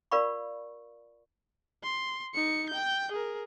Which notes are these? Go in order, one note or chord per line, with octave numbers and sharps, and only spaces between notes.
F4 A#4 D5 F5 B5 C#6
C6
D#4 C#7
G5 G6
G#4 A#4